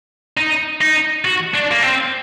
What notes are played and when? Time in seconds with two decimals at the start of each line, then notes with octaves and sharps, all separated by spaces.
0.38 D#4
0.81 D#4
1.25 F#4
1.54 D4
1.71 A#3
1.83 C4